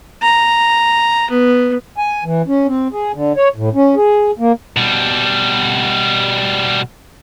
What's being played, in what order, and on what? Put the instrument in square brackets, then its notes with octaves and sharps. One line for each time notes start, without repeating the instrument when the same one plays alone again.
[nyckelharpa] A#5
B3
[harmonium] G#5
E3
C#4
C4
G#4
D3
C#5
A2
C#4
G#4
A#3
[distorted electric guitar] B2 G3